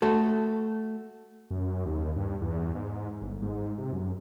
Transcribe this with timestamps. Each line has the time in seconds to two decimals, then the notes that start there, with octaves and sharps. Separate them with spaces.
0.02 A3 F#4 A4
1.51 F#2
1.86 D#2
2.16 G2
2.41 E2
2.75 G#2
3.22 G1
3.42 G#2
3.78 C3
3.93 F#2